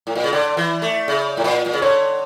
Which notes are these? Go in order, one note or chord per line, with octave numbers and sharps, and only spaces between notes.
A2
A#2
C#3
D3 D5
E3
A3
C#3
A2
A#2
A#2
C#3
D3 C#5